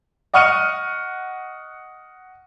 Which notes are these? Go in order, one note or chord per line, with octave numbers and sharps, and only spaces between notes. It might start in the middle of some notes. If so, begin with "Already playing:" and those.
D#5 F#5 C#6 F6 C#7 D#7